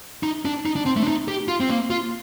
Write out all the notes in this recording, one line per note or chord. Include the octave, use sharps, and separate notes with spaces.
D#4
D4
D#4
D4
C4
A3
D4
D#4
G4
F4
C4
A#3
F4